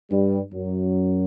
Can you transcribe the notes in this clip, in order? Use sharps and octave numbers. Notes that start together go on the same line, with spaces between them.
G2 G3
F#2 F#3